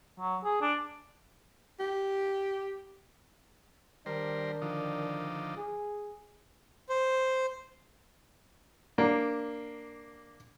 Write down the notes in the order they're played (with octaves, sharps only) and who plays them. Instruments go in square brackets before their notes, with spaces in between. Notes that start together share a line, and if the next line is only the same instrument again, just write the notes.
[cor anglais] F#3
G#4
D4
[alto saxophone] G4
[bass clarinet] D#3 [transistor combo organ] G3 A#4 C5 [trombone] D4
[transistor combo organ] D3 F3 D#4
[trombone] G#4
[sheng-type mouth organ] C5
[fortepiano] A#3 D4